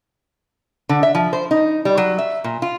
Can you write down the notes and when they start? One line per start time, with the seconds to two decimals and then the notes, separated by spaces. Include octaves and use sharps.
0.89 D3
1.03 E5
1.15 F3
1.33 C5
1.51 D#4
1.85 G3
1.98 F#3
2.19 E5
2.44 A#2
2.62 F4